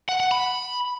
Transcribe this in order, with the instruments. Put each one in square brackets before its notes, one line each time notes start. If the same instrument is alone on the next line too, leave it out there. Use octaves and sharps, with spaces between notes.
[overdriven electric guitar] F#5
F#5
B5